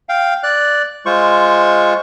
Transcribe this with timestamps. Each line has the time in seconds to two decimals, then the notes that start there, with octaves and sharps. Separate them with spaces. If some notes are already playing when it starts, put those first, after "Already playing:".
0.09 F5 G5
0.43 D5 F#6
1.06 G#3 F4 C5 C#6